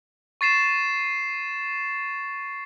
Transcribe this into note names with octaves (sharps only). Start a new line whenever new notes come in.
C#6 A6 C7 E7